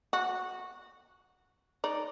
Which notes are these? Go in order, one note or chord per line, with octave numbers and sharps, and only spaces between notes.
F#4
D#4 D5